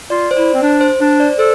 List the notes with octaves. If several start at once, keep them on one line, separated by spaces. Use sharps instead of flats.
F4 D5
C5
E4 D5
C4
D4 C5
C5
D4 C5
D5
A4 C5